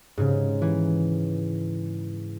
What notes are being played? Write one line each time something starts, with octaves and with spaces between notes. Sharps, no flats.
G#2 C#3
E3